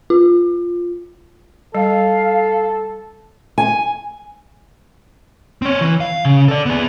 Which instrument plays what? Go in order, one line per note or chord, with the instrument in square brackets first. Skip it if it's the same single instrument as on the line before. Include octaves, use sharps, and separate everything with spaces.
[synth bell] F4
[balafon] G3 [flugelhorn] A4 [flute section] F5
[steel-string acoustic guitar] G#5
[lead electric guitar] C4 C#5
E3
F5
C#3
A4 D5
B3 G#4